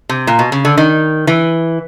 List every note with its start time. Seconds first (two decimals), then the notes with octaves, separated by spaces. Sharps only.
0.09 C3
0.27 A#2
0.39 B2
0.52 C#3
0.65 D3
0.77 D#3
1.27 E3